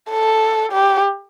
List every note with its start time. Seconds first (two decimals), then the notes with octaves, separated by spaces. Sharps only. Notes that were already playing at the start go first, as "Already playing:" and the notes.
0.10 A4
0.72 G4